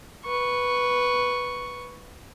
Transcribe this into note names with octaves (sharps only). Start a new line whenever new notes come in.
B4 C#6